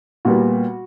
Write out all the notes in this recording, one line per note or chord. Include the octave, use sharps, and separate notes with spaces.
A#2 G3 B3 F#4